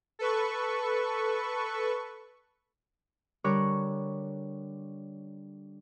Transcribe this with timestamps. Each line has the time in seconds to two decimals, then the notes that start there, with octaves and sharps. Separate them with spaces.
0.19 A4 B4 C#6
3.44 D3 G3 A#4 C#5 D6 F#6